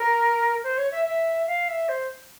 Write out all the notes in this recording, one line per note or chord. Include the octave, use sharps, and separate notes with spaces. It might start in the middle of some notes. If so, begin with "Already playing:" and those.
Already playing: A#4
C5
C#5
E5
E5
F5
E5
C5